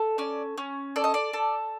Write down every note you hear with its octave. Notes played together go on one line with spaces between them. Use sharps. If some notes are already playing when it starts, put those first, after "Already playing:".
Already playing: A4
C#4 D5
C#4
A4 D5
D#5
D5
A4